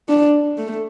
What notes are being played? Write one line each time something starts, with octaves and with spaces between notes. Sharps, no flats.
D4
A3